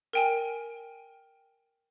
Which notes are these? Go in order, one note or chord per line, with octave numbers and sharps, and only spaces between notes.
A#4 G5 G#5